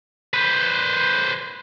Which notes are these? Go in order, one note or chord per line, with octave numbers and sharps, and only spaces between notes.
B4 C5